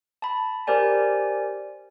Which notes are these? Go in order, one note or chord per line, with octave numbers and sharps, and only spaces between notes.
A5 B5
G4 A#4 C5 D5 G#5